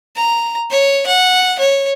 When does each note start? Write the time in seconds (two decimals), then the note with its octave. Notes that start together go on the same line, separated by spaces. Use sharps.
0.16 A#5
0.71 C#5
1.06 F#5
1.59 C#5